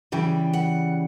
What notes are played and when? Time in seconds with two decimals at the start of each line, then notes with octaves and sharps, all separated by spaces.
0.12 C#3 E3 G3 G5
0.53 F#5